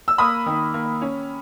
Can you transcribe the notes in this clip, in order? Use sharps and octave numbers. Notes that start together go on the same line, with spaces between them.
E6
A#3 B5 D#6
D#3
A#3
C#4